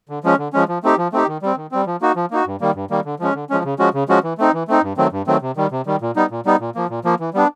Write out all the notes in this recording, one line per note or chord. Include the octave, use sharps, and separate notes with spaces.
D3
F3 G#3 C#4
D3
F3 G#3 C#4
F3
A3 C4 D#4 G4
F3
A3 C4 D#4 G4
D#3
G3 C4
D#3
G3 C4
F3
A#3 D#4 F#4
F3
A#3 D#4 F#4
G2
D#3 G3 A#3
G2
D#3 G3 A#3
D3
F3 G#3 C#4
D3
F3 G#3 C#4
C#3
F3 G#3 C#4 F#4
C#3
F3 G#3 C#4 F#4
E3
A3 C4 D#4
E3
A3 C4 D#4
G2
D#3 F#3 A3 C4
G2
D#3 F#3 A3 C4
C3
D#3 G3
C3
D#3 G3
A#2
G3 B3 D#4
A#2
G3 B3 D#4
A#2
F3 A#3
A#2
F3 A#3
E3
G3 B3 D4